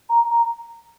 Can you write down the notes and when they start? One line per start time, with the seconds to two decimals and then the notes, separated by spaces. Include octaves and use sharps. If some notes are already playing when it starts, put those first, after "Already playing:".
0.09 A#5
0.31 A#5